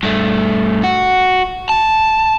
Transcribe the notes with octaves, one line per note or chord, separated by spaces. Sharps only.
G2 A3
F#4
A5